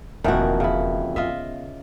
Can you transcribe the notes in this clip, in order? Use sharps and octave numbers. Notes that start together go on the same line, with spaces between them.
E1 F2 B2 D#3 E3 A#3 F#4
C#3 E4
B3 F4 D#5 E5